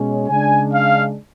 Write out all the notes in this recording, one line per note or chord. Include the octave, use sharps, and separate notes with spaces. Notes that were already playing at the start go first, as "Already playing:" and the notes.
Already playing: B2 G#3 C#4
C#3 G#3 D4 G#5
F5